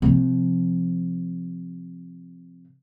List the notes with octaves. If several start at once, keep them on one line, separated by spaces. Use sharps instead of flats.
C3 F3